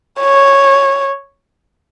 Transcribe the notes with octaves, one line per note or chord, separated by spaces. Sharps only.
C#5